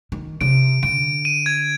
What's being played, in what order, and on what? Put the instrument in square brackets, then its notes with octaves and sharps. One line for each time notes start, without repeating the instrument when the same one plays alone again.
[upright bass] D#3
[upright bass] C3 [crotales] D7
[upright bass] D3 [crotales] D7
[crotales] D#7
G#6